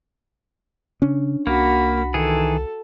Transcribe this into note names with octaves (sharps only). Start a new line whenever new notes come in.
C#3 C#4 D4
C2 A#3 F#4 B5
D#3 E3 G#4 A4